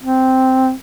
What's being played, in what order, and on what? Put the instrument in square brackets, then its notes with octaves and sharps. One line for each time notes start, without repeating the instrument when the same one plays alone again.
[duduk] C4